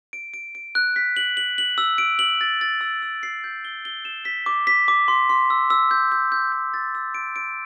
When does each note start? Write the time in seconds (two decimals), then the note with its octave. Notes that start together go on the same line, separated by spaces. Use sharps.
0.13 D7
0.34 D7
0.55 D7
0.75 F#6
0.96 B6
1.17 F#7
1.37 F#7
1.58 F#7
1.78 E6
1.98 D7
2.19 F#7
2.41 A6
2.61 A6
2.81 E6
3.02 E6
3.23 C7
3.44 G6
3.65 G7
3.85 G7
4.05 E7
4.25 B6
4.46 D6
4.67 B6
4.88 D6
5.08 C6
5.29 C6
5.50 E6
5.70 E6
5.91 G6
6.12 G6
6.32 G6
6.52 G6
6.74 A6
6.95 E6
7.15 D7
7.36 D7